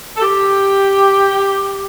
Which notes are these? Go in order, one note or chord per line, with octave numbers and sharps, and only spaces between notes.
A4
G4